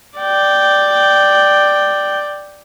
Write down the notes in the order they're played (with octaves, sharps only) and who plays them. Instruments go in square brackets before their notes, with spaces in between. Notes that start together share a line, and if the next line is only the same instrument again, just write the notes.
[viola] D5 G5